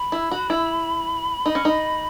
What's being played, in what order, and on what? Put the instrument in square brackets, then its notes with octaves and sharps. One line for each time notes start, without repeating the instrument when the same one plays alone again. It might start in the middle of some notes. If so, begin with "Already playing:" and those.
Already playing: [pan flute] B5
[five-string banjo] E4
F#4
E4
D#4
C#4
D#4